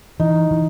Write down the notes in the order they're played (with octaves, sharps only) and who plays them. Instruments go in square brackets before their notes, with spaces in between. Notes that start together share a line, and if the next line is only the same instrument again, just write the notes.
[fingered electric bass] E3 [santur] D#4
[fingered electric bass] E3